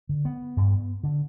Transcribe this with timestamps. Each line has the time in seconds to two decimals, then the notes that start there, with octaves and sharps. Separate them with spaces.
0.09 D3
0.25 B3
0.57 G2
1.03 D3